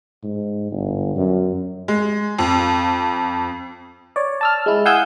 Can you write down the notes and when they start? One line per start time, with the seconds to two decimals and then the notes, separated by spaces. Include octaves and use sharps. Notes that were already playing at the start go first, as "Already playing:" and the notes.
0.23 G#2
0.72 G1
1.16 F#2
1.88 G#3
2.39 F2
4.16 C#5 D5
4.41 A5 E6 F6
4.66 G#3 E4
4.86 F5 F#5 G#5 D#6 E6 G6